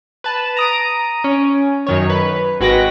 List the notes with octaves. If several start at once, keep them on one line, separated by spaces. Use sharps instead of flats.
B4 A5
A#5 D#6 D7
C#4
F#2 D#3 C#5
B4
G#1 G#3 F#4 B4 G5 A#6